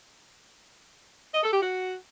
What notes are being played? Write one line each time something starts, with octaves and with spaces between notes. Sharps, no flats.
D#5
A4
G4
F#4